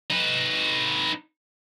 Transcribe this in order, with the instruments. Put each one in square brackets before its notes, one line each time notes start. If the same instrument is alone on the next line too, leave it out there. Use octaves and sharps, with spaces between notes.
[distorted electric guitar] D#4 B4